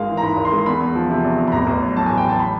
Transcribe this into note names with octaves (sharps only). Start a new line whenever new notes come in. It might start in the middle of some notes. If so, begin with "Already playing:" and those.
Already playing: G#1 G#3 F5
E3
A#5
G#2 B5
G#1
C6
G#3
E2 B5
E2
F3
C3
E2
E2
B5
A1 A#5
A1
F#3
A2 A5
A1 G#5
G5
A1 A5
B5